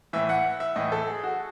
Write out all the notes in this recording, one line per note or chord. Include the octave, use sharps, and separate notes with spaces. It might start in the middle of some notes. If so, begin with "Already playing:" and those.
A2 E3 E5
F#5
E5
A2 E3 D#5
A4
G#4
F#4